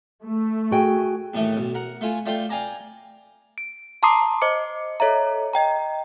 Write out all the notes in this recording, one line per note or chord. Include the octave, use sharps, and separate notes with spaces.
A3
F#4 G#4 G5
D#2 A2 E3 A3
B1
A#4 F#5
A3 F4 G#5
A3 F4 D5 G5 C6
D5 F5 G5 G#5 A#5 D6
D7
A5 A#5 C6 D6 D#6 C7
C5 D#5 D6 C#7
A4 C#5 D#5 E5 A#5
D#5 G5 A#5